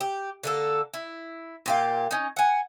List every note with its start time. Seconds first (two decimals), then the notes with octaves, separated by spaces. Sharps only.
0.01 G4
0.43 D3 A#3 A4
0.94 E4
1.66 A#2 G4 F5
2.11 C#4 D#4
2.36 F#5 G#5